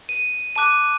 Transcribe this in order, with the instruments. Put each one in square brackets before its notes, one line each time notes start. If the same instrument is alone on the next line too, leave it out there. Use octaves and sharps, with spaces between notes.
[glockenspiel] D#7
A5 D6 F#6 D#7